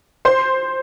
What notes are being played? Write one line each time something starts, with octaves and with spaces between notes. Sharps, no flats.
C5 C6